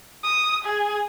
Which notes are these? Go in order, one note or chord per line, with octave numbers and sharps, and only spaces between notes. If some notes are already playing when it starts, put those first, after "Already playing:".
D#6
G#4